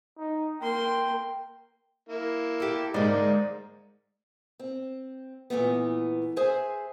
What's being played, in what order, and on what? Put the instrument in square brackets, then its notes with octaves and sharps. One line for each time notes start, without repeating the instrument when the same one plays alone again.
[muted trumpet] D#4
[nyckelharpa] A#3 C6 [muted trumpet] G5
[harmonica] A#3 E4
[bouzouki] G4 A4
[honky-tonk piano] G#2 [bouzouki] D3 G#3 [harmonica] A#3 D#4 [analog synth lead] D5
[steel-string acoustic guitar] C4
A#2 E3 A3 B3
G#4 C5 E5 G#5